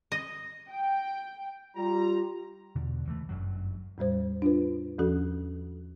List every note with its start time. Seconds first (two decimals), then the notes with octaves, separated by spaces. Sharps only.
0.12 D#5
0.70 G5
1.76 G3 F4 A#5
2.76 E2 B2 D3
3.05 C#2 E3 A3
3.29 G1 F#2 F#3
3.98 E2 A2 G3 C5
4.42 D4 F4 B4
4.99 E2 F3 C#4 F#4 A4